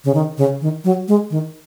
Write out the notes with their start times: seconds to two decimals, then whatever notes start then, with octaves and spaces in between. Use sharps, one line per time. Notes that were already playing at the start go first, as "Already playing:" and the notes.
0.04 C#3
0.15 D#3
0.38 C#3
0.61 D#3
0.84 F#3
1.08 G#3
1.30 D#3